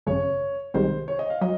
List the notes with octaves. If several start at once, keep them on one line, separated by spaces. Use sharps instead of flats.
G#1 F#2 C#3 C#5
C2 C3 D#3 G#3 C5
C#5
D#5
F5
F#3 D#5